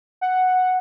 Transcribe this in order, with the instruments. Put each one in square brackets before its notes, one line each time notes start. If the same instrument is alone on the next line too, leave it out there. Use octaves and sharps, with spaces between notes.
[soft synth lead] F#5